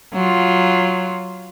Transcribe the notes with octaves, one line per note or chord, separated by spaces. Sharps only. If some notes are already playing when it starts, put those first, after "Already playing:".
F#3 F4